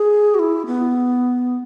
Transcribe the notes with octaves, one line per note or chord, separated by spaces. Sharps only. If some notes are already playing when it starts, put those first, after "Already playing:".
Already playing: G#4
F#4
E4
B3